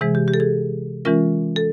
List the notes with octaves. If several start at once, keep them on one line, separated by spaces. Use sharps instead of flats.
C3 E3 G#3 G#4
G4
G4
A4
G#4
E3 G#3 C#4 F4 A#4
A4